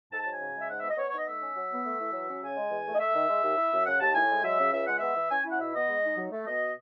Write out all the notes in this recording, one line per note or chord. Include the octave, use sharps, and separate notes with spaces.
G#2 A5
F#3 A5
G#5
C#3
G#3
E5
G#2 F#5
B3 E5
D#5
B3 C#5
D#4 C#5
D#5
A3 E5
C#4
F#3
B3
A3
E3
F#3
C#4
C#3 G#5
G#3
E2
A3
D#5
A3 E5
D#3
G#3
D#2
E4
F#2
C#3 F#5
D#2 A5
A2 G#5
G#3
F#3 E5
C#3
C#2 E5
G#3 F#5
B3 E5
E3
C#4 G#5
E4
F#5
B2 E5
B3 D#5
G#3
D#4
F#3
A3
B2 D#5